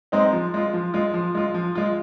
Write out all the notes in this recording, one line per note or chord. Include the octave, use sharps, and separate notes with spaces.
G#3 C4 D#4
F3
G#3 F4
F3
G#3 F4
F3
G#3 F4
F3
G#3 F4